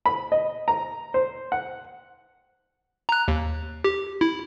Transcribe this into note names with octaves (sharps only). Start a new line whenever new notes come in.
B5
D#5
A#5
C5
F#5
A#5 F#6
D#2
G4
E4